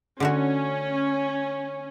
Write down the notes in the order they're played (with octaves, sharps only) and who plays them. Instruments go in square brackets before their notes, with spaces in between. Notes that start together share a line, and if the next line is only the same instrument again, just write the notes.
[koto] D3 A3 F#4 [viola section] C#4